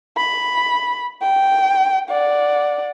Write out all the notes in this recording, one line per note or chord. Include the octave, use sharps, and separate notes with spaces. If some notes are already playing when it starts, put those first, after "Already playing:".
B5
G5
D5 F#5